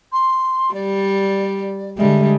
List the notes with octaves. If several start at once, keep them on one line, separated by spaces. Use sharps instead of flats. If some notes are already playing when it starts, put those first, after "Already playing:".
C6
G3 D5
D3 G3 G#3 E5